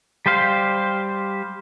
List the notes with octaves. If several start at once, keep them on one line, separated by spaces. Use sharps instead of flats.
G3 G4 C5 F5